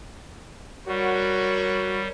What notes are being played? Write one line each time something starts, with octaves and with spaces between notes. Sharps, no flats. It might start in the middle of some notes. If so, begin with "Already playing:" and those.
G3 F#4 A#4 C#5